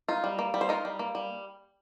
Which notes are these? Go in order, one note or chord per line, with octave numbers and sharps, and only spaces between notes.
D#4 F4
G3
A#3
G3
C5
D#4 F4 A#4
G3
A#3
G3